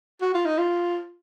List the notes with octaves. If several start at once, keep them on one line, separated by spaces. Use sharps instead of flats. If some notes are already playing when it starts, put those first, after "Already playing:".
F#4
F4
D#4
F4